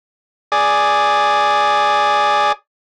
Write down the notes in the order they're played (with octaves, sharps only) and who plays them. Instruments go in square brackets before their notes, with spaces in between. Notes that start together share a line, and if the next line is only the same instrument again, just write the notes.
[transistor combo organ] G#4 D5